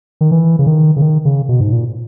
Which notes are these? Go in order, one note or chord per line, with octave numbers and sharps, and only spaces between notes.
D#3
E3
C#3
D#3
C#3
D#3
C#3
B2
G#2
A#2